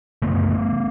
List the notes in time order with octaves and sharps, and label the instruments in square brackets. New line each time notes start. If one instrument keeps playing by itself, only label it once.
[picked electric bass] F#2 C#3 A3 B3